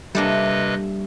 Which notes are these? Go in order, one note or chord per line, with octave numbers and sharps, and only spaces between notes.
C3 G3 A#3 D4 A4 B4 D#5 E5